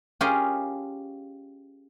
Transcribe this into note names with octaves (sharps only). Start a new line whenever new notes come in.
C#4 F4 G4 G#4 A#4 D#5